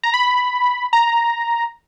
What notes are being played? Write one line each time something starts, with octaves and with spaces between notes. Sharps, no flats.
A#5
B5
A#5